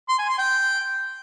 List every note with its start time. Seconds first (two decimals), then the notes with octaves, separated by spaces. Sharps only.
0.09 C6
0.19 G#5
0.29 C6
0.39 G5